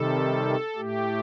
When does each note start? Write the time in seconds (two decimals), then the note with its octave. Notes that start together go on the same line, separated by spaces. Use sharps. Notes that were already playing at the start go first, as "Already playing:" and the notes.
Already playing: C3 D#3 G3 A4
0.76 A2 A3 G4